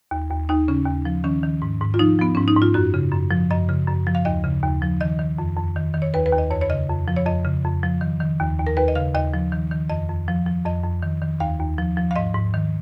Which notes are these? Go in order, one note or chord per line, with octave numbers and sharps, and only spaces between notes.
D#2
D#2
D#2 D#4
C#3 C#4
D#2
F3
D#3 C#4
D#3
G#2
G#2
F4
F3 D#4
F3 B3
G#2 C#4
D#4
G#2
F4
F#2 F#4
C#3
F#2
F3
F#2 D#5
C#3
F#2
F3
F5
D#2 D#5
C#3
D#2
F3
D#3 D#5
D#3
F2
F2
D#3
D#3
C#5
D#2 B4
B4
D#2
D#5
F2 C#5
C#5
C#3 D#5
F2
F3
C#5
F2 D#5
C#3
F2
F3
D#3
D#3
D#2
D#2
A#4
D#2 B4
D#5
C#3 F5
D#2 D#5
F3
D#3
D#3
F2 D#5
F2
F3
F3
F2 D#5
F2
D#3
D#3
D#2 F5
D#2
F3
F3
F5
G#2 D#5
G#2
D#3